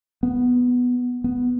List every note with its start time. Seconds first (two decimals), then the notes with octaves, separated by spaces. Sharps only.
0.23 B3
1.24 B3